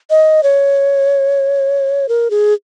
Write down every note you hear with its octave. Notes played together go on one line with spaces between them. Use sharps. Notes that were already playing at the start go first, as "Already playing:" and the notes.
D#5
C#5
A#4
G#4